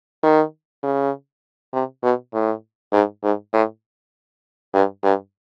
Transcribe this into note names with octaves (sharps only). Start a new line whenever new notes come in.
D#3
C#3
C3
B2
A2
G#2
G#2
A2
G2
G2